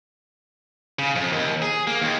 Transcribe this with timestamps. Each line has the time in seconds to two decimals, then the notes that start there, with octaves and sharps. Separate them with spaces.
0.99 C#3
1.16 F2
1.32 D#2
1.62 G#4
1.87 A#3
2.02 D#2